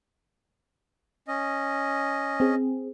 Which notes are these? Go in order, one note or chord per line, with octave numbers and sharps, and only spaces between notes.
C#4 D#5
C4 G#4